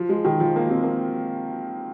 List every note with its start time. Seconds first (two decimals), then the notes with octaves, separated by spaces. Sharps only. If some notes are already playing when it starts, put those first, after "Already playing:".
Already playing: F3
0.09 G#3
0.25 D#3
0.40 F3
0.56 A#3
0.69 C4
0.84 A#3